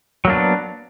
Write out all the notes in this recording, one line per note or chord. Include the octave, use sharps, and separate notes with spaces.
F#3 A#3 B3 D4